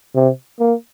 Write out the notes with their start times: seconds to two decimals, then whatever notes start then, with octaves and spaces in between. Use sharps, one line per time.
0.15 C3
0.60 A#3